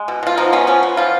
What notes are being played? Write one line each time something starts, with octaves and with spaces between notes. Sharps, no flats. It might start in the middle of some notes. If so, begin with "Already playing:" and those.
Already playing: G#3
B2
B2 F4
F3 D#4
B3 C#4
F3 C#4
B3
F3 F4